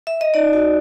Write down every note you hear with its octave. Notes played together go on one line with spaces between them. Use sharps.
E5
D#5
D#4 D5
F#4